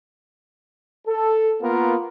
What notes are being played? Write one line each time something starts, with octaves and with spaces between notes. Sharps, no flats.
A4
A#3 B3 F4 A#4